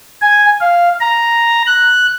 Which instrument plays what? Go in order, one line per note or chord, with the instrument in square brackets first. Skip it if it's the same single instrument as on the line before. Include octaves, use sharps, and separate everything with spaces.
[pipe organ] G#5
F5
A#5
F#6